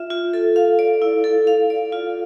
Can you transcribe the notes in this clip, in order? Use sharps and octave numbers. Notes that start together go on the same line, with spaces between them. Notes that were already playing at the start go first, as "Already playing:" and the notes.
Already playing: F4 E5
F4
A4
F5
D5
E4
A4
F5
D5
F4